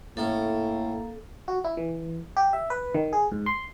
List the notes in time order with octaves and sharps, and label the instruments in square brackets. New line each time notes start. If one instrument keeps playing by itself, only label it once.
[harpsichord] A2 C#4 [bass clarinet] A#3 [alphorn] E4 [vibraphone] A4
[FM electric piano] F#4
E4
E3
G4
E5
B4
D#3
G#4
G#2
C6